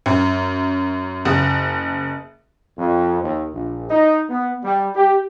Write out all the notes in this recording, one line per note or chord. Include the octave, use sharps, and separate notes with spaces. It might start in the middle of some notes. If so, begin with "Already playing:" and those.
F#2
F#1
F2
D#2
A#1
D#4
B3
G3
G4